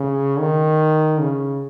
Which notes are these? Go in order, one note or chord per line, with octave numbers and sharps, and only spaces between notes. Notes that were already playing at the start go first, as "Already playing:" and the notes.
Already playing: C#3
D#3
C#3